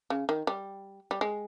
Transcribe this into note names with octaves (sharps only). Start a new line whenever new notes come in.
C#3
D#3
G3
G3
G#3